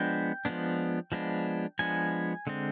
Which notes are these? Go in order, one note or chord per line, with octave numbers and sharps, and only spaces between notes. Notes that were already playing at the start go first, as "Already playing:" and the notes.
Already playing: F3 G#3 B3 D4 G5
F3 G#3 B3 D4
F3 G#3 B3 D4
F3 G#3 B3 D4 G#5
D3 G#3 C4